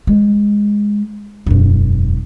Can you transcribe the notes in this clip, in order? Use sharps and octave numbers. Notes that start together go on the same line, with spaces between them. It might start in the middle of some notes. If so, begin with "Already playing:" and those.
G#3
E1 F#2